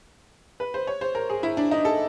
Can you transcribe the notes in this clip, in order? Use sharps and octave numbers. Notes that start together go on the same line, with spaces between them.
B4
C5
C#5
C5
A#4
G#4
E4
D4
D#4
A4